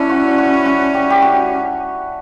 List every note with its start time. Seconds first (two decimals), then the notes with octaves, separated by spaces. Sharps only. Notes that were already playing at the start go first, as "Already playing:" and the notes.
Already playing: C#4 D4 E4
0.09 F#4
0.38 F#4
0.66 F#4
0.94 G4
1.10 G4
1.22 F#4